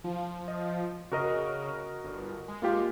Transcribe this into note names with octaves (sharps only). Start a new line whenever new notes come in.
F3
D#5
C#3 F#4 A#4 D#5
G1
G#3
A#3 F4 G4